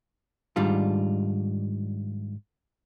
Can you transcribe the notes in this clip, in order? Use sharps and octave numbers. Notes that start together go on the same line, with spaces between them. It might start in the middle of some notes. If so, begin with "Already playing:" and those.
G#2 D#3 G3 D4 F4